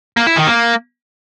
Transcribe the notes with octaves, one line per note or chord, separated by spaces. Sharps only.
A#3
E4
D#3
A#3